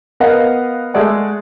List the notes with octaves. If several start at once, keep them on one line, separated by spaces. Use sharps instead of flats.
B3 A#4 D#5 F5 F#5
G#3 A3 D5 F#5